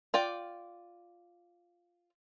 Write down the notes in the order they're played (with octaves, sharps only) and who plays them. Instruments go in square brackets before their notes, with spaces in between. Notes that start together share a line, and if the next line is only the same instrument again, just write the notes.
[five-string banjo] F4 D5 G5